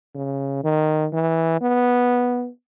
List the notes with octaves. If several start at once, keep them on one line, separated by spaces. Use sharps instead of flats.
C#3
D#3
E3
B3